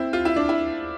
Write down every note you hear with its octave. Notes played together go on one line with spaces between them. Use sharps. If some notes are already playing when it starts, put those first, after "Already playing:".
Already playing: C4 E4
F4
E4
D4
E4